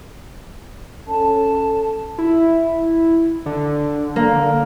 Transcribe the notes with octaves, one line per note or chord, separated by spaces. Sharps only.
C#4 A4 A5
E4
D3
A#3